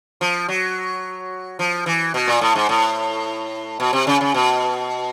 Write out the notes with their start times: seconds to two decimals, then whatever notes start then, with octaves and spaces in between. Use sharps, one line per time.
0.21 F3
0.48 F#3
1.59 F3
1.86 E3
2.14 B2
2.28 A#2
2.41 A2
2.55 G#2
2.69 A2
3.80 B2
3.93 C3
4.07 C#3
4.21 C#3
4.34 B2